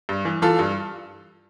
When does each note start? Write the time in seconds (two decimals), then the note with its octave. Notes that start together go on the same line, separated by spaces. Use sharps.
0.09 G2
0.25 E3
0.42 E3 F4 A4
0.59 G2